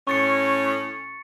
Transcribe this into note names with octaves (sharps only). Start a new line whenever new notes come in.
A2 C#4 C#6 A6 C#7